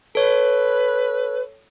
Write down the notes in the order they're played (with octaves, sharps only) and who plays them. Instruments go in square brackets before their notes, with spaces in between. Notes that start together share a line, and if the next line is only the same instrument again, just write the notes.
[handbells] A4 C#5 [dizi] B4